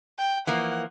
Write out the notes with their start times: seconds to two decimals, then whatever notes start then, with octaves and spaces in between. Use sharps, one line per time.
0.18 G5
0.47 E3 F3 A#3 F#5